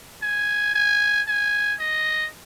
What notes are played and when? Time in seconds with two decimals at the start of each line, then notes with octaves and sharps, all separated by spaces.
0.22 G#5
0.75 G#5
1.27 G#5
1.80 D#5